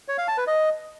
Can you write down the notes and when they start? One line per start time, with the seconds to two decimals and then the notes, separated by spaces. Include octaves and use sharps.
0.08 C#5
0.18 F5
0.28 A5
0.38 B4
0.47 D#5